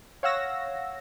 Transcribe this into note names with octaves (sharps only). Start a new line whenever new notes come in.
C#5 F5 F#5 E6 A#6